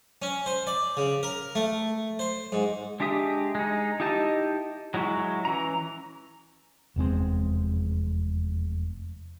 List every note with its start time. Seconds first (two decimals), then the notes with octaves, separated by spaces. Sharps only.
0.22 C#4
0.46 C5
0.67 D5
0.97 C#3
1.23 A#4
1.55 A3
2.19 C5
2.52 G#2
3.00 G#3 D4 G4 E5 D#6
3.55 G#3 D#4
4.00 D#4 E4 G4 D#5 A5
4.94 F#3 G#3 E4 F#4
5.45 E3 C#4 A#5
6.96 F1 E2 G#3 C4